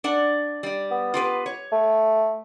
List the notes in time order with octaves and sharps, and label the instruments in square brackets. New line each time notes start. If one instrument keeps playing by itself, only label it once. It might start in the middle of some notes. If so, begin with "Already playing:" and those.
[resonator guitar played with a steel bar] D4 D5 F#5
G3 D5
[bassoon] B3
[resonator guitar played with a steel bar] F4 G4 B4
C#5
[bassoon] A3